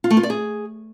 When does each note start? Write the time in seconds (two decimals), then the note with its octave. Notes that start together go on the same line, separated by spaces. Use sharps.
0.04 F4
0.11 A3
0.17 F4
0.23 D5
0.30 G#4